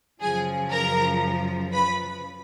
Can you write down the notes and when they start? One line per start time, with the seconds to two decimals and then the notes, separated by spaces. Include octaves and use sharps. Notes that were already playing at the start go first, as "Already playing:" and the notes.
0.20 F#2 C#3 F3 G#4 G#5
0.71 A#4 A#5
1.72 B4 B5